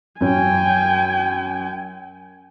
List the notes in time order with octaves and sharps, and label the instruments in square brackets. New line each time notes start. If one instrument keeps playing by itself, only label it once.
[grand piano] F#2 C#4 [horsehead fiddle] G5 G#5